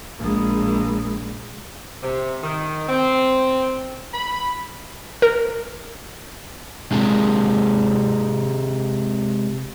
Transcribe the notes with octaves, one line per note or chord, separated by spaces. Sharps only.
A#1 G#3
C3
D#3
C4
B5
A#4
C3 G#3